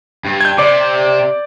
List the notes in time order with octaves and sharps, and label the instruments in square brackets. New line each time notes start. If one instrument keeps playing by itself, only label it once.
[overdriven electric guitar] G2
[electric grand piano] G6 G#6
[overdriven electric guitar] C3 [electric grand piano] D5 D6